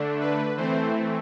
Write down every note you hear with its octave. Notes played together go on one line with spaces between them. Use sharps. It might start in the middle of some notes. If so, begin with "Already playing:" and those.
Already playing: D3 A3 D4
B4
E3 A3 C4 C5